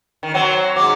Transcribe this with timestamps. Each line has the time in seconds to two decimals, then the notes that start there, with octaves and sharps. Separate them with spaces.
0.23 D#3
0.34 F#3 C4
0.76 G#2 F#3 D6